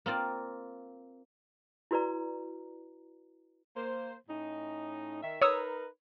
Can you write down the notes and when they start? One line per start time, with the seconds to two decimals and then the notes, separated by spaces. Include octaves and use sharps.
0.06 A#3 C4 F4 D5
1.91 E4 F#4 B4 D5 A#5
3.76 A#3 C5
4.28 A2 C#4 D#4
5.23 D#3 E5
5.42 D#4 A#4 B4 C#5 D#6 E6